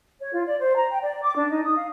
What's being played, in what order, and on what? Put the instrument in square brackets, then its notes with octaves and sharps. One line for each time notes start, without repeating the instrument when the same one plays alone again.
[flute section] C#5
F4
D5
C5
A#5
G5
D5
D6
D4
D#4
D#6
F5